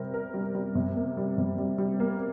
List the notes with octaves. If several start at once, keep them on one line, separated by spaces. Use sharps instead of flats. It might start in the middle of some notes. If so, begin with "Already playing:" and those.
Already playing: C3 G3 C4 A#4
A#4
G3
G3
C3
A#3
G3
C3
G3
G3
A#3